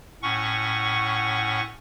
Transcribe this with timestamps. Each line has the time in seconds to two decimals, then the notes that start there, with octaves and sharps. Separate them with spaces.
0.22 A2 C#4 F#5 C#6